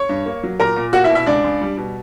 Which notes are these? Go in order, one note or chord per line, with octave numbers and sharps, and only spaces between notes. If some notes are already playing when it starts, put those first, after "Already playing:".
Already playing: C#5 C#6
G2
A#3
F#3
A#2 A#4 A#5
A#2
A#3 F#4 F#5
E4 E5
B2
E4 E5
C#2 D4 D5
C#2
G3
B2